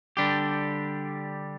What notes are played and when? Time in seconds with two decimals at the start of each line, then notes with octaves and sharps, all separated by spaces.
0.17 D3 G3 D4 G4